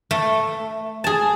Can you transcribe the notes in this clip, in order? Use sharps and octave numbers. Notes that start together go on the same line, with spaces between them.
A3
G#4 A5